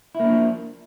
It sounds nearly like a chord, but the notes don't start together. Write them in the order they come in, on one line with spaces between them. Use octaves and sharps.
E4 A#3 D4 F3